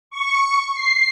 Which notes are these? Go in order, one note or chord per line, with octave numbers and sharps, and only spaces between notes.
C#6
C7